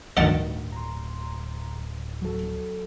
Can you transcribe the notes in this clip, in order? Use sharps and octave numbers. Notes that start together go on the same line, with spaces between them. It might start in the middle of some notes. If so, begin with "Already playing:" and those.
D1 D2 G2 D#3 D#5 F#5 A5
A#5 C6
F#3 A4